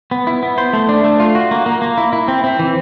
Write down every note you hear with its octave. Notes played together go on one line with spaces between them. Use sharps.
B3
E4
B3
C5
A3
D4
A3
F4
F#4
A#3
A#3
A#3
E4
E4
C4
C4
E3